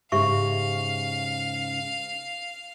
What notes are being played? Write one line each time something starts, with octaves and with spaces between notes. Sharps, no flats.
G#2 C#3 G4 E5 F5 C#6